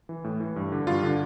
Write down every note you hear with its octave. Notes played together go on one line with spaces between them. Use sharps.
E3
A2
E3
G2
D3
G2 F4
D3